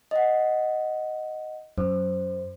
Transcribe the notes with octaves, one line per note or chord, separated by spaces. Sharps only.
D#5 F#5
F#2 C5